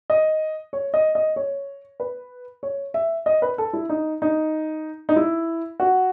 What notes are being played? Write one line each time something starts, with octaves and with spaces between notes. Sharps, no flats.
D#5
C#5
D#5
D#5
C#5
B4
C#5
E5
D#5
B4
A4
E4
D#4
D#4
D#4
E4
F#4